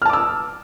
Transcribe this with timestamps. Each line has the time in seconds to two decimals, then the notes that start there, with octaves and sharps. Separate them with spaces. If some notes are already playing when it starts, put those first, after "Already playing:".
0.02 F6
0.05 A5
0.09 D6
0.13 E6